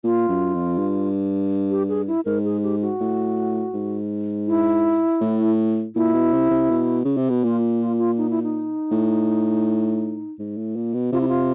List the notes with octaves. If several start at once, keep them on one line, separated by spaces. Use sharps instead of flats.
A#2 F4
F#2
F2
G2
G4
G#4
E4
G#2 A#4
G#4
G4
F#4
A2
G#2
E4
A2
A#2 E4
B2
C3
C3
B2
C#3
C3
B2
A#2 F4
F4
F4
D#4
E4
D#4
A2
G#2
A2
A#2
B2
C3 F4
E4
F4